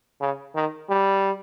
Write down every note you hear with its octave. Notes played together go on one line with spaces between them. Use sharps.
C#3
D#3
G3